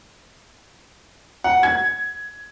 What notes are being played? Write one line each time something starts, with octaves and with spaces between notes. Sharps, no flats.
F#5
G#6